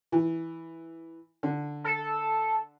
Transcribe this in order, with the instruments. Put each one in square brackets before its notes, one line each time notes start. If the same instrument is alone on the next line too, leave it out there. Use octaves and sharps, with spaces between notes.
[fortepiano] E3
D3
[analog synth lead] A4